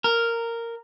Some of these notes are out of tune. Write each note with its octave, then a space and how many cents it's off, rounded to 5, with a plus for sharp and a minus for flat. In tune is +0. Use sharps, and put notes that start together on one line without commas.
A#4 -10